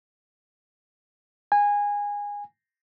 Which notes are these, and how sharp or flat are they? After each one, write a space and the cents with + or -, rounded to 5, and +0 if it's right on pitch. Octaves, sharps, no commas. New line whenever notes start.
G#5 -20